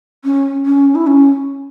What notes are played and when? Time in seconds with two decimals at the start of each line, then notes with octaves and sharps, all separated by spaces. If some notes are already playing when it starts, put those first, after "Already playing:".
0.24 C#4
0.65 C#4
0.95 E4
1.07 C#4